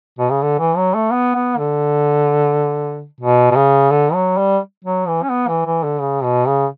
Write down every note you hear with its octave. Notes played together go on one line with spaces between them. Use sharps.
B2
C#3
D3
E3
F#3
A3
B3
B3
D3
B2
B2
C#3
D3
F#3
G3
F#3
E3
C#4
B3
E3
E3
D3
C#3
B2
C#3